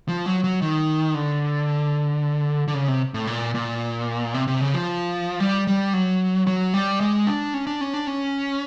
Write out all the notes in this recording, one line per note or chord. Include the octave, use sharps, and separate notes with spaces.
F3
F#3
F#3
D#3
D3
D3
C#3
C3
A2
A#2
A#2
C3
C3
C#3
F3
G3
G3
F#3
F#3
G3
G#3
D4
C#4
D4
C#4
D4
C#4